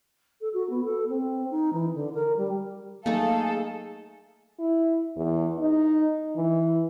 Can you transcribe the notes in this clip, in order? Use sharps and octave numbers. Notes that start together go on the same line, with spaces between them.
A4
F#4
B3
A4
C4
D#4
E3
D3
A#4
G3
F#3 A3 A#3 D#4 G#4 A4 F5 G#5
E4
E2
D#4
E3